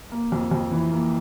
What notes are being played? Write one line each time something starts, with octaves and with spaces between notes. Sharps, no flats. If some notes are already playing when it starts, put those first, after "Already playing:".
A#3
F2
F2
E3
A#3